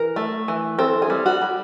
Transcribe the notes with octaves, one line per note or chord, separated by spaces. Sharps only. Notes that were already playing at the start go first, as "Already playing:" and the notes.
Already playing: E3 A#4
A3
E3
C4 A4
G#4
G3
F#4
G3